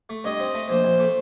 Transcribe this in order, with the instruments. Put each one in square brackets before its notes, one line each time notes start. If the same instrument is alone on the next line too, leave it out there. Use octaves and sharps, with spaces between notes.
[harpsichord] A3
[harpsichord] G2 [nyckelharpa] D#5
[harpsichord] C4
A3
[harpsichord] A#1 [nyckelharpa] C5
[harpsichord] A#1
A3